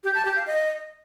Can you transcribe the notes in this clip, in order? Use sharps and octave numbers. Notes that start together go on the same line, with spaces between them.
G4
A5
G4
F5
D#5